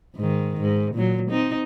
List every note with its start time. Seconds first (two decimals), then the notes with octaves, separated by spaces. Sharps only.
0.16 G#2 D#3
0.61 G#2
0.94 A#2 F#3
1.30 C4 D#4